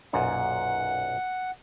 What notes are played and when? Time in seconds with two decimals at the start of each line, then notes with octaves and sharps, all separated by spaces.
0.13 B1 F#2 A#2 F#5